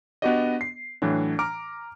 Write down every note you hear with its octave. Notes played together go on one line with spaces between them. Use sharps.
B3 D4 F#4 G4 D5 D#5
C7
A2 E3 F#3 D4
A#5 D6 F6 D7